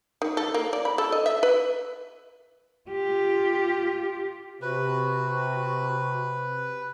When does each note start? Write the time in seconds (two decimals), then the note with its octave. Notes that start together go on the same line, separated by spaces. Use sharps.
0.22 D#3
0.37 A4
0.54 A#3
0.73 D5
0.85 B5
0.98 A4
1.12 D#5
1.26 E5
1.43 B4
2.90 F4 G4
4.62 C3 F#4 B4